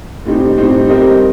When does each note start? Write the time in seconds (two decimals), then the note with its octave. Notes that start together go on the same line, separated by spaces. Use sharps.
0.25 A2 G3 C4 D#4 G4
0.57 A2 G3 C4 D#4 G4
0.89 G3 C4 G4 A#4 D#5